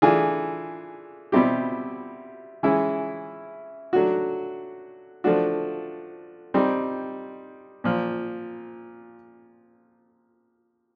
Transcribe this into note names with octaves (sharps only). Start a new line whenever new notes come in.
E3 A3 D4 F4 G#4
B2 G3 C4 E4 G4
E3 G#3 C#4 E4
F#3 A3 D4 F#4
F3 A3 D4 F#4
G3 C4 D#4
A#2 F3